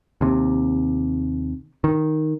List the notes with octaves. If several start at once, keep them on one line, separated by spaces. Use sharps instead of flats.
D#2 C3
D#3